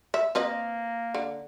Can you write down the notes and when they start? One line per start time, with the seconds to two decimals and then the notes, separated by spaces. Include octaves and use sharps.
0.14 E5
0.35 A#3 C4 B4 D#5
1.14 D3